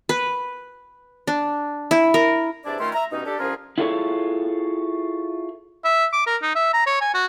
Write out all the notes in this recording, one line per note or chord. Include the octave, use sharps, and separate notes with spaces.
B4
D4
E4
A#4
E2 C3 D4 E4 D5
A#2 D#3 A3 C#4 E4 C6
E5 A#5
G2 B2 C#4 D#4
D4 G4 A4
C2 F3 C#4 F4 G#4 A#4
E4 F4 G#4 A4 B4 C#5
E5
D6
A#4
D#4
E5
A#5
C#5
G#5
F#4